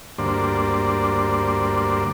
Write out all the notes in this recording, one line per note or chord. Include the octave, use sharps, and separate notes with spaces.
D2 G2 A#3 C5 D5